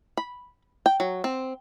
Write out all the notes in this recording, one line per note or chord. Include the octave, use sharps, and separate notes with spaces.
B5
G5
F#3
C4